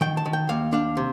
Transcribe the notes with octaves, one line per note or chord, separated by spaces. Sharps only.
D#3 G5
A5
D#3
G5
D#2 F5
D4 F5
C3